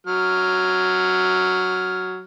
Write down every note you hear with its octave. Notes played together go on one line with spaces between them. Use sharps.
F#3 F6